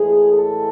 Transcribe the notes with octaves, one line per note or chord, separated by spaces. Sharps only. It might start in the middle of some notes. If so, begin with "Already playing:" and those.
Already playing: A2 E3 G#3 G#4
A4